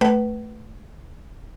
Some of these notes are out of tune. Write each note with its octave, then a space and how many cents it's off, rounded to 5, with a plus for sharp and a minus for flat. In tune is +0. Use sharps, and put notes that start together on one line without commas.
A3 +0 B4 +0 F#5 +40